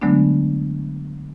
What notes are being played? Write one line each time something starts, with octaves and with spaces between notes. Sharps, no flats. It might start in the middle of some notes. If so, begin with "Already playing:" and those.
D3 F#3 G#3 A3 B3 D4